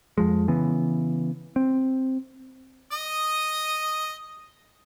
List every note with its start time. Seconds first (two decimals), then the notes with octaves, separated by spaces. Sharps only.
0.18 F2 F3 G#3
0.48 C#3 E3 B3
1.56 C4
2.91 D#5 D#6